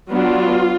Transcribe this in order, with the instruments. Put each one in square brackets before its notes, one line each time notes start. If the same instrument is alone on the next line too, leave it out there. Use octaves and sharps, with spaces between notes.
[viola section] F#3 B3 D4 F4